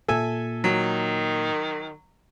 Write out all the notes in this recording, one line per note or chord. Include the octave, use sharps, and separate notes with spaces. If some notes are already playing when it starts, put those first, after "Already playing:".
A#2 A4 E5 G#5
D#3 F#3